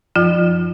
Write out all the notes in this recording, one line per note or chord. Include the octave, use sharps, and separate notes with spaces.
F#2 F3 F4